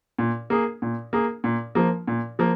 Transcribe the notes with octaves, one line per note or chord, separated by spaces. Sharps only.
A#2
A#3 G#4
A#2
A#3 G#4
A#2
F3 A#3
A#2
F3 A#3